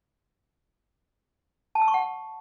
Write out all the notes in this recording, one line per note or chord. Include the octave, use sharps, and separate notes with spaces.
A5
E6
C#6
F#5